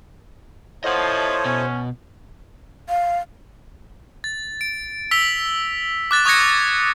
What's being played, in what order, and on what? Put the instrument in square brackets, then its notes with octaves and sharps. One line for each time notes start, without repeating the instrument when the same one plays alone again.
[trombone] F3 [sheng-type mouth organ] E4 A4 D#6 [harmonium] C5 C#5 [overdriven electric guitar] D#5 F#5
[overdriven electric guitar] B2 [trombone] C#4
[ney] F5
[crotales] A6
D7
E6 B6 F7 G7
D6 F#6 A6
C#6 D#6 F#6 G#6 A#6 C#7